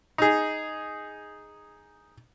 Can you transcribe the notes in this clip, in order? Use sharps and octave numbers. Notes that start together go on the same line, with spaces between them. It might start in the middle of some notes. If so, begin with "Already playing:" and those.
D#4 G#4